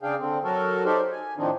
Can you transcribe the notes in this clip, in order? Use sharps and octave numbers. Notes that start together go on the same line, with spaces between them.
C#3 D4 G#4 F5 G5
D3 C4
F#3 F#4 A4 A#4
D#4 G4 A4 A#4 C5 D5
G#5
A2 D#3 F3 C4 D4 D#4